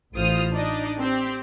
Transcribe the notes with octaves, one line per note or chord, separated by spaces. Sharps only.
A1 E3 F4 C5 D#6 F6
D4 D#4 D5 D#5
C4 G4